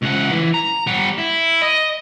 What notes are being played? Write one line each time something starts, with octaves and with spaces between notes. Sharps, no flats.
C#2 F#5
E3
A#5
G3 F#5
E4
D#5